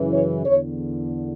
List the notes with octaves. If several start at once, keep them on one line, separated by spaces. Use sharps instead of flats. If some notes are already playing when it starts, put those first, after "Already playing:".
Already playing: F#2 C#3 E3
C#5
E2 D3 C#5